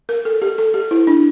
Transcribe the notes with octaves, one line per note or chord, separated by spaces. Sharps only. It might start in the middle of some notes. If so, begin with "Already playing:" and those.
A#4
A4
G4
A4
G4
E4
D4